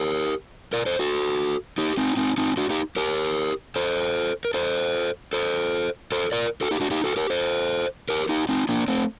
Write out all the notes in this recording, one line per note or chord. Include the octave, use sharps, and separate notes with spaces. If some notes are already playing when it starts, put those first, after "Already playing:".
Already playing: G4 A#4
A#4 D5
A4 C5
F#4 A4
D#4 G4
C4 D#4
C4 D#4
C4 D#4
D4 F#4
D#4 G4
G4 A#4
A4 C5
A#4
A4 C5
A4 C5
A4 C5
A#4 D5
F#4 A4
D#4 G4
D4 F#4
D#4 G4
F#4 A4
G4 A#4
A4 C5
G4 A#4
D#4 G4
C4 D#4
A#3 D4
A3 C4